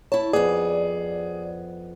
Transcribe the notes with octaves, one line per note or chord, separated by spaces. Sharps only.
E4 C#5 A5
F2 B3 G#4 D5